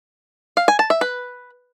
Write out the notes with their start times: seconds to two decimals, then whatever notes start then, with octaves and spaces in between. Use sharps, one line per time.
0.57 F5
0.68 G#5
0.79 A5
0.90 E5
1.01 B4